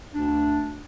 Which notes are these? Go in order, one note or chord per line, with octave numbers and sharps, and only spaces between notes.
D2 D4